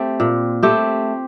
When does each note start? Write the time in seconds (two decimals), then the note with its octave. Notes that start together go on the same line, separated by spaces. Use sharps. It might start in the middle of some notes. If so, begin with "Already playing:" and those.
Already playing: A3 C4 G4
0.20 A#2
0.63 A3 C4 G4